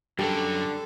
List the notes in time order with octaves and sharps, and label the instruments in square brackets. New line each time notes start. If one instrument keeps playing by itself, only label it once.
[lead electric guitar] F#2 F#3 [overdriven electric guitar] D3 [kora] G3 [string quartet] A4